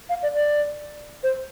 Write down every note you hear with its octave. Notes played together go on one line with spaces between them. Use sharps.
F5
D5
D5
C5